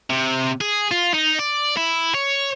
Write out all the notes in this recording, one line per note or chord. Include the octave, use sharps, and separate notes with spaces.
C3
G#4
F4
D#4
D5
E4
C#5